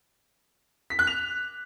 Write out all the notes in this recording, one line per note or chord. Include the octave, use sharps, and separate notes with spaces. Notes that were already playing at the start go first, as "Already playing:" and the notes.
B6
F#6
F7